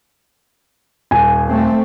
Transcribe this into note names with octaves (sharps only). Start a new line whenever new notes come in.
D#1 G#5
A3 C4